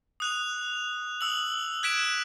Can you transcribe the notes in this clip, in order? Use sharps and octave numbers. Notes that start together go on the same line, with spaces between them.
D#6 F#6 F7
D#6 E6 F#7
F#6 G#6 B6 D7 E7